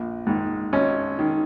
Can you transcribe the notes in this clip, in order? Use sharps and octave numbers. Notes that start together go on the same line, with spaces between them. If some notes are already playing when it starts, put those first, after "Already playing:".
Already playing: A#1
G#2 D#3
G#1 C#4
D#3